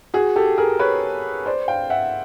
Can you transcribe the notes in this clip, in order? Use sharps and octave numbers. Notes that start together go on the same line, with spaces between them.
F#4 G#4
G4 A4
G#4 A#4
B4 C#5
C5 D5
F5 G5
E5 F#5